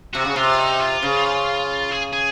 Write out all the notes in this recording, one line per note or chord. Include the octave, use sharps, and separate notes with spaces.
C3 F#4
C#3
C3 F4
D#4
F4
C#3
G#4
G#4